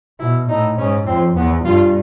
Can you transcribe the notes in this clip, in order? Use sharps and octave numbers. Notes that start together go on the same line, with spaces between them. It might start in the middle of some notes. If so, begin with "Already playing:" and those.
B2 E4
A2 D#4
G#2 C#4
F2 C4
E2 B3
G2 F4